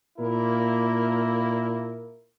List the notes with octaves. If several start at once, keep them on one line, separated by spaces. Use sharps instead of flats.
A#2 A#3 E4 A#4